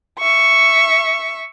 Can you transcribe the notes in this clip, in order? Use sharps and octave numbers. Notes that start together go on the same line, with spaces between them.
E5 C#6